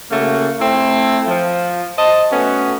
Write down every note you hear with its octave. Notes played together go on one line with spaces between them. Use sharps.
C#3 A3 A#3 F#4
A3 C4 E4
F3
C5 D#5 A5
A3 B3 C#4 F#4